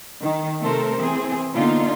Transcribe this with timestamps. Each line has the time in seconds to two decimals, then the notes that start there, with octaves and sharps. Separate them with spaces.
0.23 D#3
0.62 C3 A3 A4 A#4 C5
1.00 E3 C4 G#4
1.54 B2 D3 A#3 D#4 F4